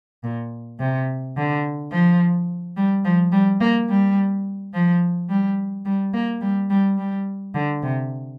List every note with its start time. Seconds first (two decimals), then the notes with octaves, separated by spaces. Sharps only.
0.24 A#2
0.79 C3
1.37 D3
1.92 F3
2.77 G3
3.05 F3
3.32 G3
3.61 A#3
3.89 G3
4.74 F3
5.29 G3
5.85 G3
6.13 A#3
6.41 G3
6.70 G3
6.97 G3
7.55 D3
7.83 C3